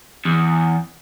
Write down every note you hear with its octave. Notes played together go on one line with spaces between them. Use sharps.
E2